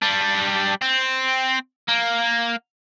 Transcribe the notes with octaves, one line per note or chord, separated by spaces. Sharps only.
G3 D4
C4
A#3